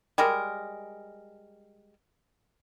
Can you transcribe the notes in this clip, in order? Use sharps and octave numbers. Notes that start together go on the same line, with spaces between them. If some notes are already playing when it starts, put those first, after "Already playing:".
G3 G#3 A#4